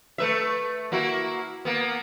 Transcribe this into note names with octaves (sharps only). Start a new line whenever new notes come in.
A3 B4 E5
A#3 E4 F#4
A#3 B3